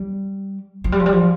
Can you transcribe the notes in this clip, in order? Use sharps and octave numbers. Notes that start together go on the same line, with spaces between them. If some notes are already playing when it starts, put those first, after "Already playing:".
Already playing: G3
F3
G3
F3
G3
F3